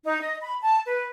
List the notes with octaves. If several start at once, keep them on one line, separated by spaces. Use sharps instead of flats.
D#4
D#5
B5
A5
B4